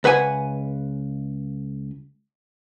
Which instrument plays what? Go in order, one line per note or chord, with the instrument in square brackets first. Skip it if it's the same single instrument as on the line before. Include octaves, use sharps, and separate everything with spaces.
[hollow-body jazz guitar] C#2 B4 F#5 G#5